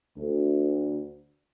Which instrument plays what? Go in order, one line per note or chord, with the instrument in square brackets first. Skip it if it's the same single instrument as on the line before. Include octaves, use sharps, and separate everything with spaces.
[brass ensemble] D2